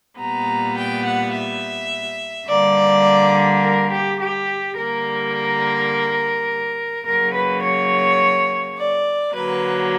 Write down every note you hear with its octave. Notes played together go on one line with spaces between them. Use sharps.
A#2 G3 B3 A#5
G5
F#5
E5
D3 G3 A#3 D5
A#4
G4
G4
D3 G3 A#3 A#4
C#3 F#3 A#3 A#4
B4
C#5
D5
D3 F#3 A#3 B4